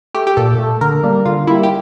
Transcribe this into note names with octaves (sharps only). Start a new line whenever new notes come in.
A3 G4
G4
A#2 A4
A3
D3 A#4
G3 A#3
D3 F4
G3 A#3 E4
G4